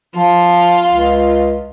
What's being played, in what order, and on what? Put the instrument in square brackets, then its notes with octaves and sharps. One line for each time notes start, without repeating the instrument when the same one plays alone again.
[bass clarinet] F3 [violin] F4
[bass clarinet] C#2